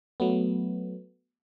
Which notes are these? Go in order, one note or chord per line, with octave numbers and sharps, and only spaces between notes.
F#3 A3 B3